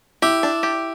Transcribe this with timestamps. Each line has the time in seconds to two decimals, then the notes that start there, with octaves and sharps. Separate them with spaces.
0.22 E4 G4
0.43 D4
0.63 G4